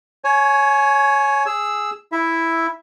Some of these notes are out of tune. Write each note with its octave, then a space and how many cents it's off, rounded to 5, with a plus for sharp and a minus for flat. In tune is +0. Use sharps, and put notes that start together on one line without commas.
C#5 +0 G#5 +25
G#4 +0 E6 +0
E4 +0 E5 +0